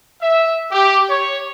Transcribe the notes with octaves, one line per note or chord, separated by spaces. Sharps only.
E5
G4
C#5